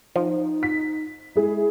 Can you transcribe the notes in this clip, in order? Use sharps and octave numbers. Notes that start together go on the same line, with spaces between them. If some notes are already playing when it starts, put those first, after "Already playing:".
F3 D#4
B6
G#3 E4 G#4